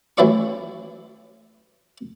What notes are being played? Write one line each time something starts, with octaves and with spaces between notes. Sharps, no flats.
A1 E3 F#3 E4 D5 C#6